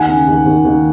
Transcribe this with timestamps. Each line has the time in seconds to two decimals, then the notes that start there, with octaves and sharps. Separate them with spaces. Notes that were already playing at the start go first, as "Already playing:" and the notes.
Already playing: D#2 F#5 G#5
0.09 C#3
0.27 D#2
0.46 D#2
0.65 D#2